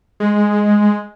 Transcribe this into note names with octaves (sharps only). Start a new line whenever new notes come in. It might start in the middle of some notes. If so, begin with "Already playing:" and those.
G#3